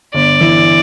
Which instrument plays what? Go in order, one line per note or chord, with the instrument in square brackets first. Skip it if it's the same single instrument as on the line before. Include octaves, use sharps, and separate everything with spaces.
[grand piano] G1 [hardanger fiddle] D5
[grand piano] E3